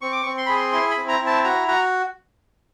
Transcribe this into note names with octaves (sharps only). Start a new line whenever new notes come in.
C4 C#6
D6
C4 C#6
C6
G#4 B5
C6
E4 C6
B5
C4
A#5
E4
A5
F#4 A#5
F#4 A#5